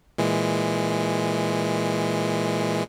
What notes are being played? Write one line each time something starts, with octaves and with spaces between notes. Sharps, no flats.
A#2 E3 G#3